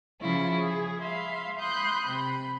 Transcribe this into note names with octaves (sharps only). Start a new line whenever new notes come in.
C#3 F3 C#4 E4 F4
G#4
E5 F5 B5 C6
B5 C6 D#6 F#6 G6
C3 B5